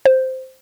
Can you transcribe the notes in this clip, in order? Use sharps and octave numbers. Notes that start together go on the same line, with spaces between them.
C5